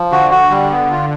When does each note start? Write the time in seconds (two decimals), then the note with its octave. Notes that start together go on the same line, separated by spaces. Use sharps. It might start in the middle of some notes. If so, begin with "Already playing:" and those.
Already playing: F3
0.11 D3 F#4
0.31 F#4
0.50 D3 G3
0.71 B3
0.91 F4